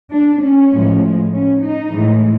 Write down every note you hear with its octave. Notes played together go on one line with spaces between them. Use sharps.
D4
C#4
A2 F3 G#3
C#4
D#4
A2 E3 G#3